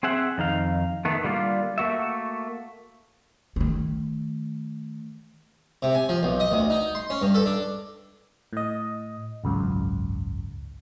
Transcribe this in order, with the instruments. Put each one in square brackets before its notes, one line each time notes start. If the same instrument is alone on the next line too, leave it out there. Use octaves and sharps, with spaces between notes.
[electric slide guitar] C4 G#4 E5 F#5
F2 D#3 D#4 F5
D#3 A3 B3
D3 G3 A#3 F4
A3 A#3 F#4 E5
[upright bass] D#3 A3
[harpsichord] C3
G#5
F3
B1
D#5
D2
D#4
C6
C#4
G2
A4
D4
[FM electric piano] A2 D#5
G#1 C#2 F#2